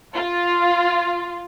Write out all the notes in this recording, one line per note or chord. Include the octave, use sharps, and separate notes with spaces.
F4